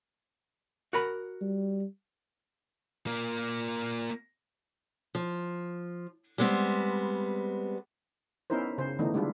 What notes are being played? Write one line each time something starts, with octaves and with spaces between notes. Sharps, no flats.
F#4 A#4 B5
G3
A#3 F4
F3
G3 G#3 B3 C4
B3 C#4 D#4 E4 A#4 C5
C#3 C5
D3 E3 A3 B3 D4 D#4
G3 G#3 D4 E4 F4